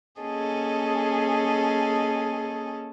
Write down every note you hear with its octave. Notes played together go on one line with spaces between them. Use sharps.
A#3 C#4 G#4 A4 D#5